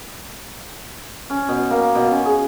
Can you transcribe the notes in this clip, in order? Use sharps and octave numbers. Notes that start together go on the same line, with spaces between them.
C#4
B2
A#3
B2
C#4
G#4